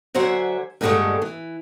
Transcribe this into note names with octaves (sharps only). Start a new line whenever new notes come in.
D3 F#3 C5 E5 F#5 G#5
G2 A#2 D3 D#3 G#3 A3
E3